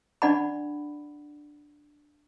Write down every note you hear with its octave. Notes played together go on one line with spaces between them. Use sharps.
D4 D5 F#5 B5